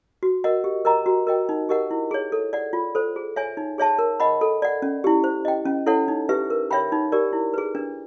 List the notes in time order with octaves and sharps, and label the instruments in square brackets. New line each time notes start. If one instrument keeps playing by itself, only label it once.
[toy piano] F#4
A#4 D#5 F#5
G4
A#4 D#5 G5 A#5
F#4
A#4 D#5 G5
D#4
G4 A#4 D#5 F#5
E4
G#4 C#5
A4
D5 F#5
F4
A4 C5
G#4
C#5 E5 G#5
D#4
G#4 C#5 E5 A5
A#4
D#5 F#5 B5
A4
D5 F#5
C#4
E4 G4
C5
D#5 G5
C#4
E4 A4 C#5 F#5
D#4
G4 B4 E5
A#4
C#5 E5 G5 B5
D#4
G4 A#4 D5
E4
G#4 B4
D4